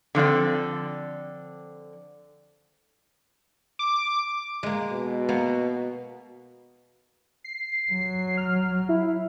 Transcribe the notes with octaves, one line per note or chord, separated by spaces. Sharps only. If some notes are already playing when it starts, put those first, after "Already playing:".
D3 F3 C4 D5
D6
G#3 A#3
B2
A#3 B3
C7
F#3
F6
E4